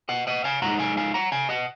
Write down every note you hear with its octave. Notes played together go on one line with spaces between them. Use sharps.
D#5 F#5
D#5 F#5
F5 G#5
G#2 D#3 G#3 D#4 F#5 A#5
F5 G#5
F5 G#5
F#5 A#5
F5 G#5
D#5 F#5